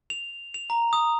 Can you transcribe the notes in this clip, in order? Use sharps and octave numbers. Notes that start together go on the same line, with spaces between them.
F7
F7
A#5
D#6